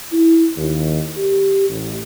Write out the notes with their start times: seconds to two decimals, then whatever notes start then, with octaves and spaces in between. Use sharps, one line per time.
0.12 E4
0.57 D#2
1.17 G4
1.69 A1